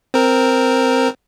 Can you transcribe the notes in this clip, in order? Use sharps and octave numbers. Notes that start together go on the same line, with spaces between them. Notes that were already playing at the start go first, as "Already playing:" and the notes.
C4 A#4